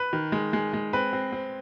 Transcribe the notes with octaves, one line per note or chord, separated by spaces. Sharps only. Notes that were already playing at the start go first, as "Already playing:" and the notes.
Already playing: B4
D#3
G#3
G#3
G#3
C4 B4
C4
C4